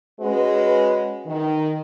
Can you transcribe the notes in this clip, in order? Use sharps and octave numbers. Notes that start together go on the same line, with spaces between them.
G#3 C#4 F#4 B4
D#3